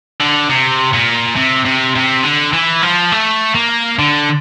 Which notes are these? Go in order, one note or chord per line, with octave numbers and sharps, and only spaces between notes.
D3
C3
A#2
C3
C3
C3
D3
E3
F3
A3
A#3
D3